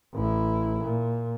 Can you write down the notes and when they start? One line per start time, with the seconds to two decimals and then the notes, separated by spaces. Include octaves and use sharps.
0.14 A1 E4
0.82 A#2